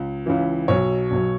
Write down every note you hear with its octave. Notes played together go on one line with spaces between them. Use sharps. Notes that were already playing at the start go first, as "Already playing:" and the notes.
Already playing: C#2
C#2 C#3 E3
B1 B2 F#3 C#5
B1 B2 F#3